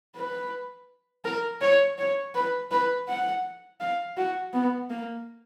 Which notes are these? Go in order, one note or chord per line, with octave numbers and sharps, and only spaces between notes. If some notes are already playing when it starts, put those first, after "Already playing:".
B4
A#4
C#5
C#5
B4
B4
F#5
F5
F#4
B3
A#3